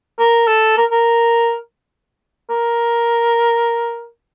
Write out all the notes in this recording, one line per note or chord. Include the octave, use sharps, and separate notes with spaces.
A#4
A4
A#4
A#4
A#4